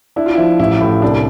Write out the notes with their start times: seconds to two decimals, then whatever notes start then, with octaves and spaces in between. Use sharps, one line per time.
0.16 D4 E4
0.26 F4
0.35 E4
0.38 F3
0.59 A1 E4
0.80 A2
1.02 C2 D4